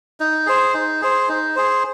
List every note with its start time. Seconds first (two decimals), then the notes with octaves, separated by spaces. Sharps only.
0.20 D#4
0.46 G#4 C5
0.74 D#4
1.02 G#4 C5
1.29 D#4
1.56 G#4 C5